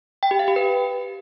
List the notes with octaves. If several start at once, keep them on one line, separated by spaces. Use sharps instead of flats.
G5
G4
F5
G4
B4